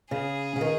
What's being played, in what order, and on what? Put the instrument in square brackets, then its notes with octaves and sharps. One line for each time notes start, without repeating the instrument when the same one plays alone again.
[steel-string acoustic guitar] C#3 [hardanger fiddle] G#4
[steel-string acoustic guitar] C#3
D#3